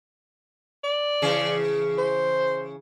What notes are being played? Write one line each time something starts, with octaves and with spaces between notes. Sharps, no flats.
D5
C#3 E3 G#4
C5